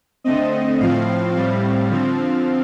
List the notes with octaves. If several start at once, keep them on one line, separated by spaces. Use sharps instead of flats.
D3 A3 C4 D#5
A2 F3 C4 F5
A2 G3 C4 F5
D3 F3 C4